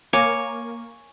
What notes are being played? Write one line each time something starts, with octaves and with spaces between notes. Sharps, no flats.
A#3 C#5 G#5 D6